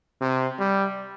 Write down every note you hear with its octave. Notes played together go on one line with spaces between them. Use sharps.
C3
G3